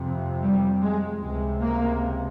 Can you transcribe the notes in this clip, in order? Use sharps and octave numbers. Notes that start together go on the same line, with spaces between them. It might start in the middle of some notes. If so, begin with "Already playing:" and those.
Already playing: F2 C3
G3
G#3
C#2 C3 G#3
A#3